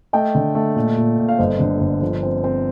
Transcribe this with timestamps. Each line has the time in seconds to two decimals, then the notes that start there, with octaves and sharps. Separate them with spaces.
0.13 A3 D#5 G5
0.35 D3
0.55 A3
0.76 A#2
0.97 A#2
1.18 A#2
1.28 F5
1.38 G1 C5 D#5
1.59 D3
1.80 G1
2.02 F3
2.23 C4
2.44 C4